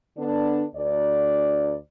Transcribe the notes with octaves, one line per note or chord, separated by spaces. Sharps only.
D3 B3 D4
D2 D5